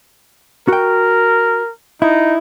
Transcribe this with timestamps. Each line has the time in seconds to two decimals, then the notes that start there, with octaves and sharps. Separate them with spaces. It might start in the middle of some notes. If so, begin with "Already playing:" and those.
0.68 F#4 A#4 G5
2.02 D#4 E4